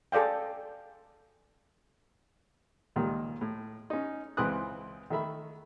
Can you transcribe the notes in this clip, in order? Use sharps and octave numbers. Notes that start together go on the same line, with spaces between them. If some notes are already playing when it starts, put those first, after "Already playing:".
G#4 A4 D5 F5 G5
C#2 A#2 D#3 G3
A2
C#4 D#4
C#2 E3 C4 B4 D#6 F#6
D#3 A3 E5 B5